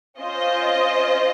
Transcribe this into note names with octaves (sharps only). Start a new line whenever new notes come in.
C#4 F4 C5 D#5